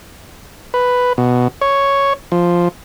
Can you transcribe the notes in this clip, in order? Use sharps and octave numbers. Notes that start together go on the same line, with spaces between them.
B4
B2
C#5
F3